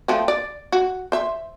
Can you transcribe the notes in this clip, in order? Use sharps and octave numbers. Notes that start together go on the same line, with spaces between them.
F3 A3 C4
D5
F#4
C5 E5